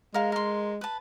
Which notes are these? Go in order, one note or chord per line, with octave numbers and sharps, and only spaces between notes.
G#3 A#4 F5
A#4 C6
B4 A5